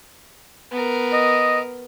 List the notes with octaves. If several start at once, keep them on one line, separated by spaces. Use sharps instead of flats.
B3 A#4
D#5